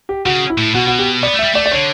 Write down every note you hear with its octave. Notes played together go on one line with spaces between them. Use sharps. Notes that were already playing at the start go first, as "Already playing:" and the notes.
G4
C#3 F#4
E4
A2
B2 F#4
F#4
G4
B3 D5
A3
G3 E5
A3 D5
D5
D3 C#5